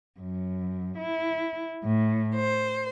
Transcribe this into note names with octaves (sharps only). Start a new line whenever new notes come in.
F#2
E4
A2
C5